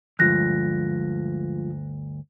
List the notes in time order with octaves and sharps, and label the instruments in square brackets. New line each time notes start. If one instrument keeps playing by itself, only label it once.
[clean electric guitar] D2 G2 [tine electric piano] F3 G#3 F4 [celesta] F#6 A#6